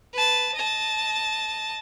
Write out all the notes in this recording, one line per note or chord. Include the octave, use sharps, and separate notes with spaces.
B4 A5
D#5 A5